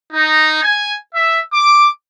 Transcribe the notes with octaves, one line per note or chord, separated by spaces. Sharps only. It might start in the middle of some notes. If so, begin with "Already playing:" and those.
D#4
G#5
E5
D6